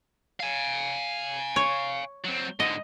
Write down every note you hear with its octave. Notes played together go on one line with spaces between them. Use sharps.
F5 G#5
C#5
F#3 C4
G#2 D3 D#5